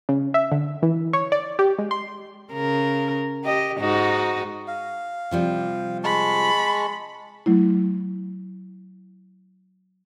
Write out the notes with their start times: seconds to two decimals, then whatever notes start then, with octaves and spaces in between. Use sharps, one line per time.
0.09 C#3
0.34 E5
0.52 D3
0.82 E3
1.13 C#5
1.32 D5
1.59 G4
1.78 G#3
1.91 C6
2.53 C#3 A#4
3.44 G4 D#5
3.79 G#2 D#4 F#4
4.68 F5
5.31 C3 F3 G3
6.04 G#3 A5 B5 C#6
7.46 F#3 A3 E4